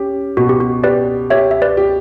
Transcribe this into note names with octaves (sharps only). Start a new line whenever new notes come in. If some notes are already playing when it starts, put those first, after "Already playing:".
Already playing: C#4 G4
B2 F#4
G4
F#4
G4 B4 D5
G4 C#5 E5
E5
B4 D5
G4